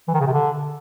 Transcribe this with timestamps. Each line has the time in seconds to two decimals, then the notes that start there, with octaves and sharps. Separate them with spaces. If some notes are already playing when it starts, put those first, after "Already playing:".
0.08 E3
0.14 D#3
0.20 C#3
0.27 C3
0.33 D3